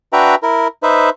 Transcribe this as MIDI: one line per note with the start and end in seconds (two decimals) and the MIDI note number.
0.13 0.35 62
0.13 0.35 66
0.13 0.35 71
0.13 0.35 76
0.13 0.35 79
0.13 0.35 82
0.43 0.68 64
0.43 0.68 70
0.83 1.10 63
0.83 1.10 71
0.83 1.10 72
0.83 1.10 76